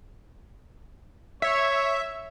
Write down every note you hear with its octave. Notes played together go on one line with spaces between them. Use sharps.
C#5 E5